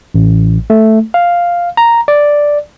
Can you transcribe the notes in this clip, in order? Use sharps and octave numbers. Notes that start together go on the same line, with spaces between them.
A1
A3
F5
A#5
D5